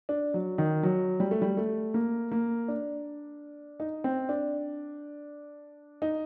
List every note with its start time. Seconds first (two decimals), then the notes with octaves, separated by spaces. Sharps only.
0.09 D4
0.34 F#3
0.58 D#3
0.83 F#3
1.20 G3
1.31 A3
1.42 G3
1.57 A3
1.94 A#3
2.32 A#3
2.68 D4
3.80 D#4
4.04 C4
4.29 D4
6.02 D#4